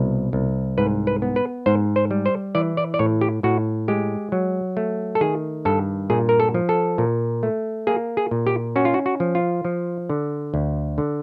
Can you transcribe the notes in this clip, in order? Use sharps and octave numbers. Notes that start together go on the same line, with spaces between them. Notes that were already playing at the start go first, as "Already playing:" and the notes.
Already playing: C2 B2
C2
G#2 B4
B4
B3
B4
G#2 C5
C5
G3
C5
E3 D5
D5
D5
A2 C#5
G4
A2 F#4
G#3 G4
F#3
A3
A4
D#3 G#4
G2 A4
A#2 G#4
A#4
A4
F3
A4
A#2
A3
A#3 G#4
G#4
A#2
G4
C#4 F#4
F4
F#4
F#4
F3
F4
F3
D3
D2
D3